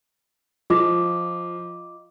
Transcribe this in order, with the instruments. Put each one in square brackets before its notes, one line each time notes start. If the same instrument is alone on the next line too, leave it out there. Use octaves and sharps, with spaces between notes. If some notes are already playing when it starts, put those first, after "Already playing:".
[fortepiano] F3 [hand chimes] F4 D#5 D6